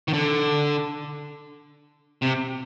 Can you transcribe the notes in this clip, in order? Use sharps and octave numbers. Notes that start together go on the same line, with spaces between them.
D#3
D3
C3